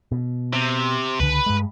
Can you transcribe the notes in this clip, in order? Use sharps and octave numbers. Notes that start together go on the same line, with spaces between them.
B2
C3
C#2 D3 B4
G2 G#3